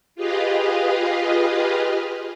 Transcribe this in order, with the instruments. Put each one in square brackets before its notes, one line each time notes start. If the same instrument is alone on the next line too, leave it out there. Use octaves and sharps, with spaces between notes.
[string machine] F4 G4 G#4 B4 D#5 F5